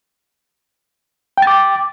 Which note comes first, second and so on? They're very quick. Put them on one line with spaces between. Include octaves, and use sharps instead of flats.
G5 A6 D6